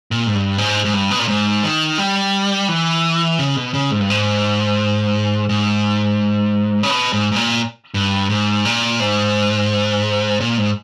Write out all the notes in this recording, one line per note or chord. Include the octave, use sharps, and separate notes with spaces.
A#2
G#2
G2
G#2
G#2
G2
B2
A#2
G#2
D#3
G3
E3
C#3
B2
C#3
G#2
G2
G#2
G#2
C#3
B2
G#2
G#2
A#2
G2
G#2
A#2
G#2
A#2
G#2